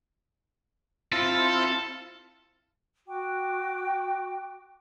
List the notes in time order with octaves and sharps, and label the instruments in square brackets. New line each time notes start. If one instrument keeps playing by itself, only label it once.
[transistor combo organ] C4 E4 F4 [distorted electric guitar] A4
[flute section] F#4 G5 D6